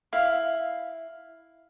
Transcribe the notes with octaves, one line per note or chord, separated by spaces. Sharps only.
E4 F5